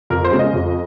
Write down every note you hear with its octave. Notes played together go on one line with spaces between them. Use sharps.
F2 A#4
C5
C#3 G#3 C#4 G#4
D#5
F2